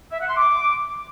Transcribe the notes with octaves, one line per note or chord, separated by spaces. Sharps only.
E5
F#5
C6
D6